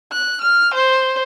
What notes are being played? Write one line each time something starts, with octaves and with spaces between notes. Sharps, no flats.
F#6
F6
C5